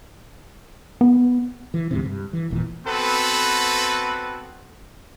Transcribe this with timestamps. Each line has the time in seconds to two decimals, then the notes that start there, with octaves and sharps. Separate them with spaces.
1.01 B3
1.74 E3
1.91 D2 G#2 C3
2.05 G2
2.33 E3
2.50 E1 A1 A#2 E3
2.87 B3 C4 F#4 A4 B4